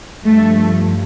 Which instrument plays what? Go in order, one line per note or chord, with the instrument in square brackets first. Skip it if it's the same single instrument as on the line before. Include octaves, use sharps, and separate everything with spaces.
[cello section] G2 F3 A3